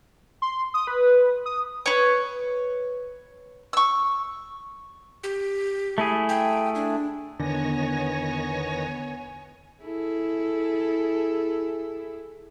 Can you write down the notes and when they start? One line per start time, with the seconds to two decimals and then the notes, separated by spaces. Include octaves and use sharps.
0.42 C6
0.74 D#6
0.87 B4
1.46 D#6
1.86 B4 C#5
3.73 C#6 E6
5.23 G4
5.98 A3 E4 G#4
6.29 G5
6.75 D4
7.40 E2 D3 D#3 B3 C#5 G#5 A#6
9.82 E4 G#4 A4